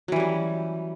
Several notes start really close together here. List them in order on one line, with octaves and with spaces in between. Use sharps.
F#3 E3 G3 C#4